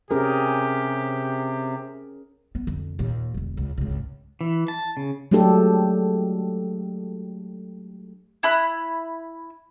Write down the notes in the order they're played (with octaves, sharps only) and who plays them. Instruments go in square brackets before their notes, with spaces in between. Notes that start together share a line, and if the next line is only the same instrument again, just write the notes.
[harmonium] C3 [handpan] C#4 G#4 A#4 [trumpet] G4
[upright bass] B3
F2 D3
D#2 A#2
E1 D3
C#2
G#1 C#2
[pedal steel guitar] E3
A5
C#3
[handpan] F#3 G#3 A3 D4 G4 A4
[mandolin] E4 B5 F#6